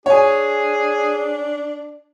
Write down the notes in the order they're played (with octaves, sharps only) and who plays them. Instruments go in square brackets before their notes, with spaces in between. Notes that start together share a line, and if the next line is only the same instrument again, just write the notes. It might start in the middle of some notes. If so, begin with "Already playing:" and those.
[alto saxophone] D4 [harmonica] G#4 [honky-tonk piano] C#5 G#5